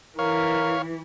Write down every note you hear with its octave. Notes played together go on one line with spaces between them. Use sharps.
E3 A#4 C#5 F5